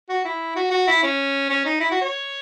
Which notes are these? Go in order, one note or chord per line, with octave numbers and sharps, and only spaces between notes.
F#4
E4
F#4
F#4
E4
C#4
C#4
D#4
E4
F#4
C#5